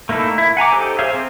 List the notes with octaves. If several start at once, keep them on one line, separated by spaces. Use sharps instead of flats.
A3 A#3 D#4 E4 A4
E4
F#5 G#5 A#5 D6
D#4 G4 A4 C5
G#4 C5 C#5 E5 F5
C4